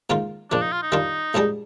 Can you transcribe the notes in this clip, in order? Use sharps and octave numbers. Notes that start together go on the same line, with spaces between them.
G#2 D#3 A#3 F4
A#1 A#2 F3 D4
D#4
F4
D#4
D#3 G3 D4 F4
A#1 G#2 G3 D4 G#4